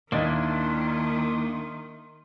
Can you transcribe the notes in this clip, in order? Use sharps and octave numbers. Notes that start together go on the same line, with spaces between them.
D#2 D#3 A#3 D4 E4 D#5 C6